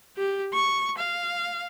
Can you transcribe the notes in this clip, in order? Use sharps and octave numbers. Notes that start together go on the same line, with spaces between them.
G4
C#6
F5